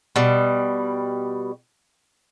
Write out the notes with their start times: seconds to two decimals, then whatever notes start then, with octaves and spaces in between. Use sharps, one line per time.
0.16 B2 G3